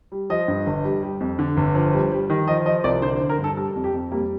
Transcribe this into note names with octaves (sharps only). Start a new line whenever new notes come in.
G3
F3 D#5
G2
G1
G3
G3
F2
D3
G1
F3
G3
G3
D#3
F3 D#5
F3 D#5
C2 D5
D3 C5
C5
D3
A#4
G2
A4
G3 A4
F2
G4
F2
G3 A#3